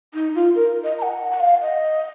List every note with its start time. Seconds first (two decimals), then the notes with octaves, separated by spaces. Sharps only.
0.14 D#4
0.35 F4
0.55 A#4
0.84 D#5
0.98 A#5
1.02 F#5
1.31 F#5
1.40 F5
1.62 D#5